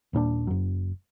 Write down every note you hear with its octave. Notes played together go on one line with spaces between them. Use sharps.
D#1 A#2 C#4 D4
F#1 F#2